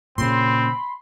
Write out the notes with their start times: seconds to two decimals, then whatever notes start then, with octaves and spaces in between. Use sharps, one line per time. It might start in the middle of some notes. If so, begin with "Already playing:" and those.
0.18 A#2 C#3 C4 B5 C6